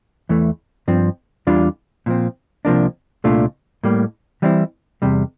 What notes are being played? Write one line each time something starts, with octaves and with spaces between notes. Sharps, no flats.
E2 E3 A3
G2 F3 C4
E2 E3 G3 D4 F4
A#2 F3 C4
C2 C3 F3 A#3 D4
C2 A#2 A3 D4 F4
A2 G3 A#3
E3 G3 C4 E4
E2 C3 G3